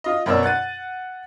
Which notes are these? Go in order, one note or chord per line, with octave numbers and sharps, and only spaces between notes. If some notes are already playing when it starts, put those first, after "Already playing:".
F4 D#5
F#2 B2 A#4 C#5 D5 E6
F#5 F#6 A6 D#7